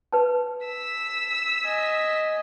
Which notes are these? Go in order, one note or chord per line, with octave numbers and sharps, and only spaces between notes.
B4 A5
E6 B6
D#5 G#5